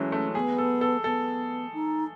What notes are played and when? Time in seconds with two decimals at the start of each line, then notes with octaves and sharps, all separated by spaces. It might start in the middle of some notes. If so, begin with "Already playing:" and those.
Already playing: E3 F#3 G#3 A3 C#4
0.12 A3
0.35 B3 G#4
0.58 A4
0.81 A4
1.04 B3 A4
1.73 D#4